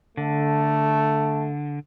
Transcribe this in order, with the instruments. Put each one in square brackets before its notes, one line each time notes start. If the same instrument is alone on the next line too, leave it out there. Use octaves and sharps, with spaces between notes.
[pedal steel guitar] D3 [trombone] A3